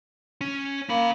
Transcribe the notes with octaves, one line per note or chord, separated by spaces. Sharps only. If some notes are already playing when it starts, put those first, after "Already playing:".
C#4
A#3 C#4 B5